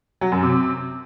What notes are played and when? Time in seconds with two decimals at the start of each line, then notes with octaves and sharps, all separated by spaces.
0.21 F#3
0.32 F#2
0.43 C3